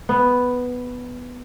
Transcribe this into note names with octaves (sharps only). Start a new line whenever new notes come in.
B3